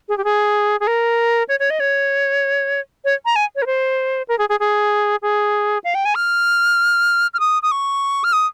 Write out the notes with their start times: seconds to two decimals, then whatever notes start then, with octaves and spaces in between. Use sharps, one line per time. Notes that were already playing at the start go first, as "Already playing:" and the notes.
0.09 G#4
0.18 G4
0.24 G#4
0.80 G#4
0.87 A#4
1.48 C#5
1.60 C#5
1.70 D#5
1.80 C#5
3.05 C#5
3.25 A#5
3.36 G#5
3.56 C#5
3.62 A#4
3.66 C5
4.28 A#4
4.39 G#4
4.49 G#4
4.60 G#4
5.22 G#4
5.84 F5
5.95 G5
6.05 G#5
6.15 F6
7.34 F6
7.40 D#6
7.62 D#6
7.71 C#6
8.24 F6
8.33 D#6